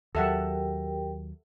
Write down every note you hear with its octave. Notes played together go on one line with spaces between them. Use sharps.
D#2 F#3 G4 A4 A#4 E5 F#5 G5